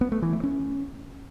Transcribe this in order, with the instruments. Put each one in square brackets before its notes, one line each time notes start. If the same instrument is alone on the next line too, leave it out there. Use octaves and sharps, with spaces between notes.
[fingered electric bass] B3
A3
E3
A3
C#4